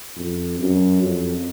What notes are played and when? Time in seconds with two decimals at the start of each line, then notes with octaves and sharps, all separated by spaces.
0.16 F2
0.60 F#2
1.03 F2